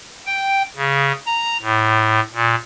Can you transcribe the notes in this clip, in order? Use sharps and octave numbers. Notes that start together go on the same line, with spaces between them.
G5
C#3
A#5
A2
A#2